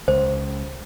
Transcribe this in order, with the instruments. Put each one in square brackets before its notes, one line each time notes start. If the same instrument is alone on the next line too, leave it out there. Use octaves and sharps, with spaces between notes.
[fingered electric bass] C#2 [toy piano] C5